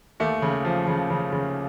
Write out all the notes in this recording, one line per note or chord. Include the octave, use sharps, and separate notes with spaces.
D#2 A3
C#3
F3
C#3
C#3
C#3